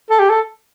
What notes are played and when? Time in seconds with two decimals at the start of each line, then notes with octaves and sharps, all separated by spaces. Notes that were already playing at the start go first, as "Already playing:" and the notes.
0.10 A4
0.20 G4
0.30 A4